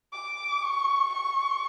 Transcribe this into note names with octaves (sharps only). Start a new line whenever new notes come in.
D6
C#6
C#6